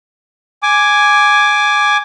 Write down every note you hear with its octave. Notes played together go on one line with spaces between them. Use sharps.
G#5 D6